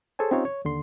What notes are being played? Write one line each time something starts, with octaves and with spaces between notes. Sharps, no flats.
G#4 A4 C5 C#5 G#5
C4 C#4 D#4 F4 G4 C#5
C#5
D#2 D3 C6